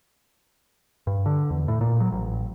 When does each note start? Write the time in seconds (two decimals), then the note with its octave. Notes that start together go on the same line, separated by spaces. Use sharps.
1.07 G2
1.26 D3
1.50 E2
1.68 A2
1.81 A#2
2.00 F#3
2.12 A1